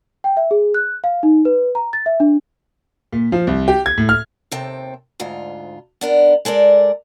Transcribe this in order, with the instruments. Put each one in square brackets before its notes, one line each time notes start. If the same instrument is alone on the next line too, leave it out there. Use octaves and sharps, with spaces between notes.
[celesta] G5
E5
G#4
F#6
F5
D#4
B4
A#5
A6
E5
D4
[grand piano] A#2
F3
C2
G4
G#6
A2
F6
[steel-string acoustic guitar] D#2 C3 C4 A4 G5
D2 G#2 F4
B3 D4 A#4
G#3 A4 A#4 D5